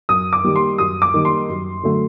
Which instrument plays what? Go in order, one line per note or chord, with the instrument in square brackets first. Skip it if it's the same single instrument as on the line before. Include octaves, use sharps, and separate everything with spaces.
[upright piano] F#2 D#6
D6
D#3 G3 A#3
C6
F#2 D#6
D6
D#3 G3 A#3
C6
F#2
D3 F#3 A3